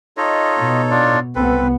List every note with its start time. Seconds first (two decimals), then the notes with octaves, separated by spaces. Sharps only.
0.17 D#4 F4 A4 C#5 D#5
0.58 B2
0.91 D4 F4 D5
1.35 C2 B3 C4 A4 B4